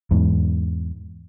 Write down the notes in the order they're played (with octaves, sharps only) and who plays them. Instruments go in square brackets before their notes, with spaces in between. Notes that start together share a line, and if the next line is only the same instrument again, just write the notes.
[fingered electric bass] E2 G#2